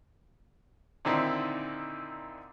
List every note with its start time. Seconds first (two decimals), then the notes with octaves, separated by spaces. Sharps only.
1.05 A#2 D3 D#3 C4 D#4 E4